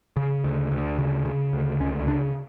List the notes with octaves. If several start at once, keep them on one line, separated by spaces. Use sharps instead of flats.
C#3
D2
D2
C#3
C#3
D2
C#2 C#4
C#3 D4